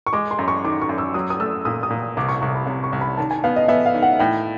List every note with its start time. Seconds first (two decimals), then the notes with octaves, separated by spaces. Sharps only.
0.06 C#6
0.13 G#3 D6
0.31 C6
0.39 F#2
0.48 C#6
0.64 D#3 D6
0.82 C#6
0.89 F#2
0.98 E6
1.14 F#3 D#6
1.30 D#6
1.40 A3 E6
1.65 A#2 D#6
1.83 D#6
1.90 A#2
2.17 C2 D6
2.29 C#6
2.42 C2 C#6
2.55 B5
2.67 C3
2.84 C#6
2.93 C2
3.01 B5
3.17 D#3 A5
3.31 G#5
3.44 B3 F5
3.56 D#5
3.68 B3 E5
3.86 F5
3.95 D#3
4.02 F#5
4.19 A2 G5